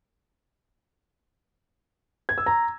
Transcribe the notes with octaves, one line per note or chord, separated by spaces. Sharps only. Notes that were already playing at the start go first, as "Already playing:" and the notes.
G#6
E6
A#5